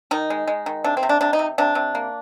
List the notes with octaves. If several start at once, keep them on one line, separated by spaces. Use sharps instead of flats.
D#3 D#4
G#3
G#3
D#3
C3 D4
C4
C3
D4
C3 D4
D#4
C3
C3 D4
C3
A#3